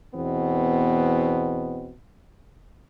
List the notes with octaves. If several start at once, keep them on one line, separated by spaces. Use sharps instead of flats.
E2 B2 B3 C4